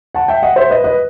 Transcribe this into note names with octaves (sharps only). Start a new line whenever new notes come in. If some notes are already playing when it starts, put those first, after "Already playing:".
F#5 A5
E5 G5
D#5 F#5
C5 E5
B4 D#5
B4 D#5